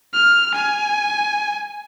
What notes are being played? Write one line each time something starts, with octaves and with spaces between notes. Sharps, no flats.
F6
G#5